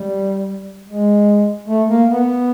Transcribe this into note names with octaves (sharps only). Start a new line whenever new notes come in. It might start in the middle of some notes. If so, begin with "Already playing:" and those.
Already playing: G3
G#3
A3
A#3
B3